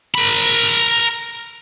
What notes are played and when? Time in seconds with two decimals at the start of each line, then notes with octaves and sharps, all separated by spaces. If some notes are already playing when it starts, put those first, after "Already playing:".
0.15 A#4 B5